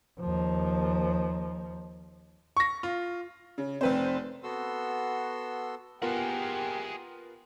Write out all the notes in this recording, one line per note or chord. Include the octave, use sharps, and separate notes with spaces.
D#2 F3
C#6 A#6
F4
C#3
F1 C4 B4 C5
B3 F#4 A4 C6 E6
B3 F4 G4 G#4 A#4 F#5